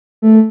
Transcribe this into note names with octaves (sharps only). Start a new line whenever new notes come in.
A3